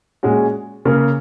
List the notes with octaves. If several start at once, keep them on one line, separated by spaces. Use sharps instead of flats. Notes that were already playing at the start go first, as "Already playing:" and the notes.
A#2 G#3 C#4 F#4
C#3 A#3 C#4 A#4